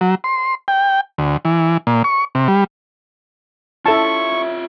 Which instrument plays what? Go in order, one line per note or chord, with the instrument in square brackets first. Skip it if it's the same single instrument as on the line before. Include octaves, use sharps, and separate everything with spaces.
[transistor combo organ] F#3
C6
G5
D2
E3
A#2
C#6
C3
G3
[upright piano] C#4 E4 [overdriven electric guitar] F4 E5 [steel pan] A4 A5 [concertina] C#6